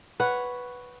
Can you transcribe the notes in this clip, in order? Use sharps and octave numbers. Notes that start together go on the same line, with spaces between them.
B4 C#5 F#5